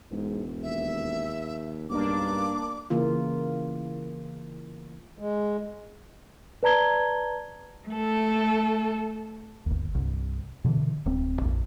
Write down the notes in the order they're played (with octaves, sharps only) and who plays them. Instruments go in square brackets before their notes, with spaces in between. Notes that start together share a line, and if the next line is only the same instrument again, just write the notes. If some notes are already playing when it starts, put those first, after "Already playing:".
[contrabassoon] E1 [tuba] G#2
[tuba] D#2 [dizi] E5
[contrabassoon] B1 [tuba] G2 [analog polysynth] A#3 D4 [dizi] D6
[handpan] C#3 E3 A#3 F4
[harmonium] G#3
[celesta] B4 D5 A5 A#5 G#6 G7
[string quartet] A3 A4
[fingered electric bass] G1 D#2
C2 G2
B2 D3 E3
D1 C4
A#1 F2